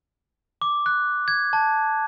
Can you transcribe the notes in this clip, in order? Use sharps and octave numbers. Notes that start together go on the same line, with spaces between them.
D6
F#6
G#6
A5